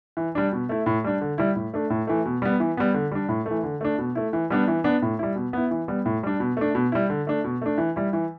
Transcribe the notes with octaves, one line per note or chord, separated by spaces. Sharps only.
E3
G3 D4
B2
A3 E4
A2
G3 D4
D3
G3 E4
A2
A3 D4
A2
E3 A3
B2
G3 B3
E3
G3 B3
D3
G3 D4
A2
E3 A3
D3
A3 D4
B2
A3 E4
E3
G3 B3 D4
E3
B3 D4
A2
G3 E4
B2
B3 E4
E3
G3 B3
A2
G3 D4
B2
A3 D4
B2
G3 E4
D3
A3 D4
B2
A3 D4
E3
G3 E4
E3